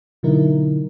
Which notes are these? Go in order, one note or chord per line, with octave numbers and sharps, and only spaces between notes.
B2 D3 F#3 D#4 E4 A#4